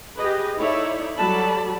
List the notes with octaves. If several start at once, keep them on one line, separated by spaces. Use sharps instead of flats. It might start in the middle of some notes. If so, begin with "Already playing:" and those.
G4 G#4 B4 D#5
D#4 E4 A4 C#5 D5 E5
F#3 G3 A4 D5 A5 B5